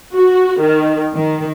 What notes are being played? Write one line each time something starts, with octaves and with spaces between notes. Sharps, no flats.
F#4
D#3
D#3